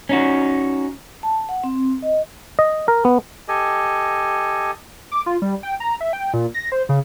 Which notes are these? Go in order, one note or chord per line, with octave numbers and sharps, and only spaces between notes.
C#4 D#4 F#4
A5
F#5
C4
D#5
D#5
A#4
B3
G4 A4 D#5 G#5
D6
F4
G3
G5
A#5
E5
G5
A#2
A#6
C5
C#3